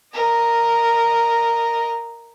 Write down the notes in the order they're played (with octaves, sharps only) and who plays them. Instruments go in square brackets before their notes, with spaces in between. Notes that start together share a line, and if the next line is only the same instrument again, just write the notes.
[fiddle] A#4 D#5